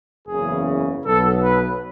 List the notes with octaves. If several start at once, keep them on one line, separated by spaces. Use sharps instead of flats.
F#1 E2 C#3 G#4
B1 B2 F#3 B3 A4
B4